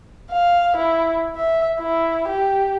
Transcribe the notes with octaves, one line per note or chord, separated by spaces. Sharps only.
F5
E4
E5
E4
G4